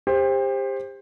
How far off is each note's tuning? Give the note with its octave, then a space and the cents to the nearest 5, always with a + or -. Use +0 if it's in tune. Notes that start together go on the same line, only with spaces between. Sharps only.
G4 +30 C5 +15